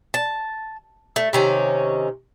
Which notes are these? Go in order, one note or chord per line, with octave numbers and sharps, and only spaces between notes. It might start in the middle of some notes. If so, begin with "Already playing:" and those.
A5
A3
C3 D#3 C#4